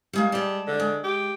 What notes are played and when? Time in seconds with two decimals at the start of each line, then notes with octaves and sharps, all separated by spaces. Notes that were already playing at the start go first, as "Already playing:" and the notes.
0.13 G3 G#3 A#3
0.32 G3 G#3 A5
0.67 D3
0.80 G#3
1.04 G4